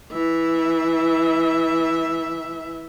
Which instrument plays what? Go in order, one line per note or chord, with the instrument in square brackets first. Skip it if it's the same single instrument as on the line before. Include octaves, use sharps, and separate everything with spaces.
[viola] E3 E5